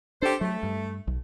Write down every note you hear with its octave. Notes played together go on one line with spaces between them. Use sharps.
D4 G4 A4 C5
F#3 A3
G2
B1